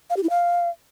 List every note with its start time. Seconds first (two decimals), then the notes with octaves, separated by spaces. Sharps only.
0.10 F5
0.17 G4
0.23 E4
0.30 F5